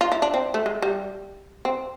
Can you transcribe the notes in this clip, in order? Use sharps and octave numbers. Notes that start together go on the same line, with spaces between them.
F4
E4
D4
C4
A3
G#3
G3
C4